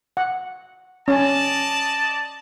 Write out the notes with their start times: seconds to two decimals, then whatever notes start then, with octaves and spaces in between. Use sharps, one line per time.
0.17 F#5
1.08 C#4 D5 D#5 A5